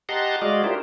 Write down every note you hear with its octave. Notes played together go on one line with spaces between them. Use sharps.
G4 D#5 F#5 A5 A#5 C6
G#3 F#4 D5 D#5 F5
D4 E4 F4 G4 A#4 C5